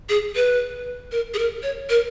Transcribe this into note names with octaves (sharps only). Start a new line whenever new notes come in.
G#4
B4
A#4
G#4
A#4
C#5
A#4